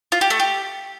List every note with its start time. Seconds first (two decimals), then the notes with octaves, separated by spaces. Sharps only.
0.12 F4
0.21 G4
0.30 A3
0.40 G4